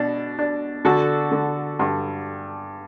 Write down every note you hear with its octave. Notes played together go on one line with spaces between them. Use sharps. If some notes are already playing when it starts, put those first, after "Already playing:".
Already playing: B2 D4
D4
D3 F#4 A4
D3
G2